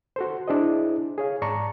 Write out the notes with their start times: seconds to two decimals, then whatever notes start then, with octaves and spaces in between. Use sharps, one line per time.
0.16 F#4 A4 C5
0.48 D4 E4 G#4 C5 D#5
1.18 G#4 C#5 F5
1.42 G#2 D5 A5 A#5 C#6